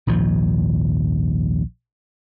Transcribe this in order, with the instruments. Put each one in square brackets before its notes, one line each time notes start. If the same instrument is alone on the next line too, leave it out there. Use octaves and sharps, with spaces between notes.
[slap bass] A#1 D#2 G#2 F3